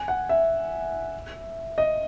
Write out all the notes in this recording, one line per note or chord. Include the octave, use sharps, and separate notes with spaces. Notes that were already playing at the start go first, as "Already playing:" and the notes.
Already playing: G#5
F#5
E5
D#5